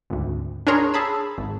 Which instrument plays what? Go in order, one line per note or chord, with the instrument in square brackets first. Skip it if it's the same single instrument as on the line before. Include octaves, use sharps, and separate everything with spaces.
[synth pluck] G#1 D2
D4 G#4 A#4 C#5 A#5 C6
G#4 A5 B5 E6
G#1